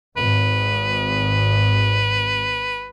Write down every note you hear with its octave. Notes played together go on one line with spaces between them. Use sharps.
G#1 B4